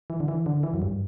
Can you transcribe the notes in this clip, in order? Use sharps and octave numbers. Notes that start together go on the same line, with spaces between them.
E3
D3
E3
D3
E3
F#2
G2